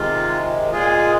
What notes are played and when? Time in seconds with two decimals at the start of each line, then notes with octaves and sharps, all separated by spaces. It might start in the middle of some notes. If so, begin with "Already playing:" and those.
Already playing: C3 D#3 G#3 F4
0.72 A#2 G#3 F4 G#4